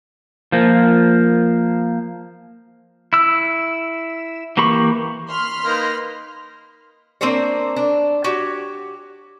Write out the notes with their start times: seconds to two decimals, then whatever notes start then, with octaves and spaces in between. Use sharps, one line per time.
0.52 F3 A#3
3.13 E4 E6
4.57 E3 A#3 G4 B5 C#6
5.30 B5 C6 F6
5.65 A#3 D#4 B4
7.21 A#3 C4 D4 C5 C#5
7.76 D4
8.24 F#4 G4 C#5